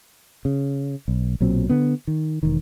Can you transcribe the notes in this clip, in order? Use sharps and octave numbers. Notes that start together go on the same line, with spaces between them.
C#3
B1
B1 A#2 F#3 C4
D3 B3
D#3
E1 D#3